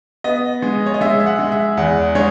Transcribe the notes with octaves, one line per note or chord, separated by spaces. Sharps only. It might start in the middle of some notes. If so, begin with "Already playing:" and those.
B3 D#5
G#3
C#5
D#5
G#3 E5
E5
F#5
G#3
E5
E2 F#5
G#3 C#5